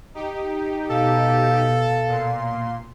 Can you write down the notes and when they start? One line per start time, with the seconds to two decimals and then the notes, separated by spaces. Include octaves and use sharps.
0.14 D#4 G4
0.90 B2 A4 F5
2.08 A#2 C6